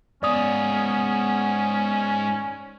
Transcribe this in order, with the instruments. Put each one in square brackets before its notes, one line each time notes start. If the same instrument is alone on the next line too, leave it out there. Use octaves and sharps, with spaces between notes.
[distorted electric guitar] G#2 F5 [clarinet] B3 [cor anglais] C#4 [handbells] D5 D#6